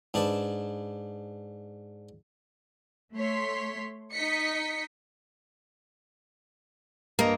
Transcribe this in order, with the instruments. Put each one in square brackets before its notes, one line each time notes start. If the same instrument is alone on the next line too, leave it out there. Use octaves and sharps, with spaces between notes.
[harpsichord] G#2 D4 B4 A5
[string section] A3 C#5 C6 B6
D#4 D#5 B6 C#7
[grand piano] G2 D#5 A#5 [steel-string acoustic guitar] A#3